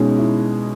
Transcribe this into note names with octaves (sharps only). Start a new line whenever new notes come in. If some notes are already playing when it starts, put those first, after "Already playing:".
Already playing: B2 G#3 C#4 D#4
E4